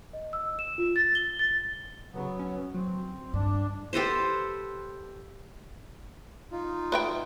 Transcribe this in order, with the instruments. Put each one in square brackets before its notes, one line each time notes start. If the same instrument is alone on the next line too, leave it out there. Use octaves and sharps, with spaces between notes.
[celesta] D#5
E6
E7
F4
A6
G7
A6
[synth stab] C2 C#3 [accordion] F#3 B3
[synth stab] C#4
[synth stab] F#3 [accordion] C4
[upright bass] G2 [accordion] D4
[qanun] G4 A4 B4 C5
[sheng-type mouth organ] D#4 F4
[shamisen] B4 E5 G5